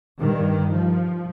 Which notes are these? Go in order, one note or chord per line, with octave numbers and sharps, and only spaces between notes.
G2 D#3
F3